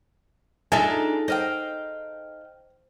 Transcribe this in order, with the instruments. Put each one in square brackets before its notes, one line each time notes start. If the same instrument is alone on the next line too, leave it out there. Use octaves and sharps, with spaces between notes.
[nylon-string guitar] D4 F4 E5 [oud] D#4 G#4 A4 [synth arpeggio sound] G#5
[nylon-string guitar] C5 [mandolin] D#5 F5 G5